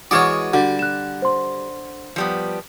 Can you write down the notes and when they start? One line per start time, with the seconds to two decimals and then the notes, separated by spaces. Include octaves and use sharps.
0.11 E3 G#3 F#4 C#5 D5 D#6 F6
0.54 D3 G3 F#4
0.79 F#6 E7
1.22 C5 C6
2.16 F3 G3 B3